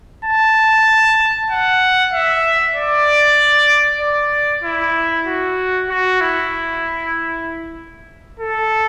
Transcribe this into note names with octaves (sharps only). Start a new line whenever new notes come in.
A5
F#5
E5
D5
D5
E4
F#4
F#4
E4
A4